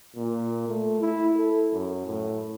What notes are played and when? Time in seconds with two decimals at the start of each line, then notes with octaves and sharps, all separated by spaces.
0.16 A#2
0.69 A3
1.00 E4
1.37 A4
1.73 F#2
2.07 A2